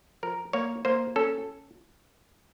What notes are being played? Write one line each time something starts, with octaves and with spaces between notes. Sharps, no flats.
F3 A#4
A#3 C#5
A#3 C5
C#4 A4